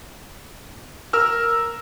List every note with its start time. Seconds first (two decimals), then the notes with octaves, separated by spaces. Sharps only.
1.13 A#4 E6 F6